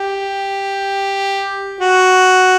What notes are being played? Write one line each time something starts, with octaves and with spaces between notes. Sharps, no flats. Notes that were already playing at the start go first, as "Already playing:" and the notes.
Already playing: G4
F#4